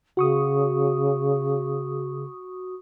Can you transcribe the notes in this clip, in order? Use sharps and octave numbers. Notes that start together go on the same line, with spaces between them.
C#3 F#4 C#6 D#6